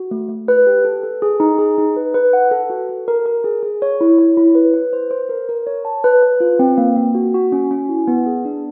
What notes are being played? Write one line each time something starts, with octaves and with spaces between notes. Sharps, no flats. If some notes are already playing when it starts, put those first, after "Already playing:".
Already playing: F#4
A3
A3
B4
G4
A4
A4
G#4
D#4
G#4
D#4
B4
B4
F#5
A4
F#4
A4
A#4
A#4
G#4
G#4
C#5
E4
C#5
E4
B4
B4
C5
C5
A#4
A#4
C#5
A5
B4
B4
F4
C4
A#3
A#3
F#4
F#4
C#4
C#4
E4
B3
G#4
D4